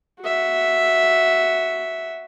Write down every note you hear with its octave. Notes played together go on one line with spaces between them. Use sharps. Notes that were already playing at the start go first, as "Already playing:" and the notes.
F#4 E5